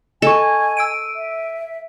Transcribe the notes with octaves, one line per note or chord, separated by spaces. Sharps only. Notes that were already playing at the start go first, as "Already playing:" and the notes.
A4 D#5 G#5 C#6
E6 D7 D#7
E5